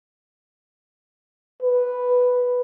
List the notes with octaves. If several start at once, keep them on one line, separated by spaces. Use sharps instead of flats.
B4